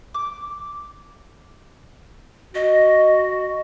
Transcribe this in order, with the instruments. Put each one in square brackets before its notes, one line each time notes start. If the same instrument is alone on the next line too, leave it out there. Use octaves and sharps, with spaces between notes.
[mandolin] D6
[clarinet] F#4 [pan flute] D#5